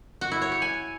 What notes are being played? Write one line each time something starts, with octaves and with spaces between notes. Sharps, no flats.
F#4
E4
C#5
G4
G#5